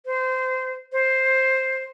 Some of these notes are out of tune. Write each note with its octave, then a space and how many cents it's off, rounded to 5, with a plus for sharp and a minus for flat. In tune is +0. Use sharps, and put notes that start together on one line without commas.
C5 -20
C5 +5